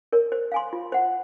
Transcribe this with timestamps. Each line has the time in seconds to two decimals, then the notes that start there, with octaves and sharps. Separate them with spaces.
0.13 A#4 C#5
0.32 C5
0.52 F5 G#5 C6
0.73 F4
0.92 C5 F#5